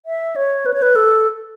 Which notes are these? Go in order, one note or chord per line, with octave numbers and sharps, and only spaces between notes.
E5
C#5
B4
C#5
B4
A4